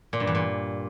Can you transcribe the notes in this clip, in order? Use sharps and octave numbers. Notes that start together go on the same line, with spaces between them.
A#2
G2
E2
A#2